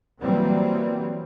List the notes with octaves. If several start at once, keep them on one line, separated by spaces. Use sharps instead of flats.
E3 F#3 G3 A#3 C4